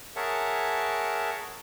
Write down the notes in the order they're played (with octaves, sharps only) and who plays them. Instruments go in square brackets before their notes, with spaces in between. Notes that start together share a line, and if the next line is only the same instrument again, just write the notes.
[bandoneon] G#4 A#4 C#5 E5 F#5 A5